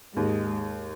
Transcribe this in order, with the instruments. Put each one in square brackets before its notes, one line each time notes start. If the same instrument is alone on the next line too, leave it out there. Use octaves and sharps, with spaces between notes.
[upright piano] D#2 [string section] G#2 G#3